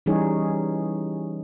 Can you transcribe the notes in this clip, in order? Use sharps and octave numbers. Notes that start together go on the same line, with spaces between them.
E3 G3 C#4 D#4 G#4 C#5